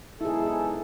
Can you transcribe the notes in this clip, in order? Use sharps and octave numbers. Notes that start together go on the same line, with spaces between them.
B1 G#2 E4 G#4 A4